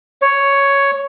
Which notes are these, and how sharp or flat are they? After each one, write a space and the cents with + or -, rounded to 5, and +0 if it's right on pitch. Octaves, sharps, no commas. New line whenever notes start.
C#5 +5